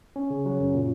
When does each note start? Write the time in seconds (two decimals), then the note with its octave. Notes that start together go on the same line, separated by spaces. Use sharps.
0.16 C#4
0.30 C#3
0.45 F#3
0.60 F#2
0.74 A#2